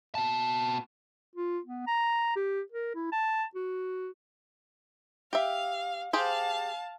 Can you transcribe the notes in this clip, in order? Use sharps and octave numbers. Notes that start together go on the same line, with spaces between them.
B2 A5
F4
B3
A#5
G4
A#4
E4
A5
F#4
G4 E5 F5
G4 G#4 C5 F5 A5